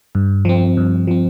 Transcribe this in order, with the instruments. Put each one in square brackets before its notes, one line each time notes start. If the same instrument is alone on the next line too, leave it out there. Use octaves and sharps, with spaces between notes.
[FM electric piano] G2
F3 C4
G2
F3 C4